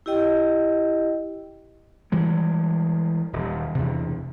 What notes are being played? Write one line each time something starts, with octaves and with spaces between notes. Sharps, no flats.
E4 G4 D#5 G5
E3 G3 G#3
D#1
E2 C3